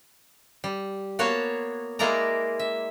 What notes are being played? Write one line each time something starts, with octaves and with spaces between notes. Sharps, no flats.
G3
A#3 B3 F#4 C#5 A5
G#3 A#3 E4 A#4 D5 A#5
E5